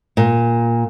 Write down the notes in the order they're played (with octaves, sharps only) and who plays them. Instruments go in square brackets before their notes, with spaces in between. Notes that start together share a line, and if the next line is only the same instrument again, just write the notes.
[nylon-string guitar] A#2